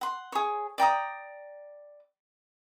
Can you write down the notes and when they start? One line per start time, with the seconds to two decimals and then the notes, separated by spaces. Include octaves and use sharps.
0.01 F#5 C6
0.32 G#4 C#5
0.78 D5 G5 A#5 D#6